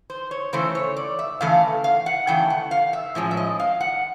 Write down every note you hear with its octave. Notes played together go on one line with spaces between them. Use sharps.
C5
C#5
C#3 E3 A3 C5
C#5
D5
E5
C#3 E3 A3 F5
F5
F#5
C#3 E3 A3 G5
F#5
F5
E5
A2 F3 G#3 C#4
E5
D#5
F5
F#5